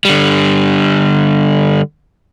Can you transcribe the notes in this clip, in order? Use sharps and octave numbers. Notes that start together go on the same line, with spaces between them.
D3 G3